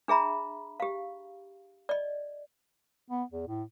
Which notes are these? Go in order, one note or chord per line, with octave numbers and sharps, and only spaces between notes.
D4 G#4 E5 A#5 B5
G4 F5
D5 D#5
B3
E2
A2